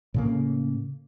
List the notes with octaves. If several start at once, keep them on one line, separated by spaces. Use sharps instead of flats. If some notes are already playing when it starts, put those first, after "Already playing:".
A2 C#3 A#3